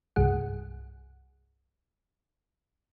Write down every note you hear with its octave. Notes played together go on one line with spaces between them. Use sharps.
C2 G2 G#4 F#5